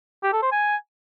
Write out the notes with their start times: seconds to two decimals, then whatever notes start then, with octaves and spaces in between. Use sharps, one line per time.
0.23 G4
0.33 A4
0.42 C5
0.52 G#5